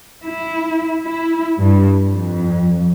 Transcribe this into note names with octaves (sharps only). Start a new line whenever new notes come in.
E4
E4
G2
F2